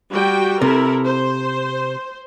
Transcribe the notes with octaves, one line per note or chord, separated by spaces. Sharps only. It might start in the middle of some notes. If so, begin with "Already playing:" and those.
G3 F#4 G5
C3 E4 A4 A#4
C5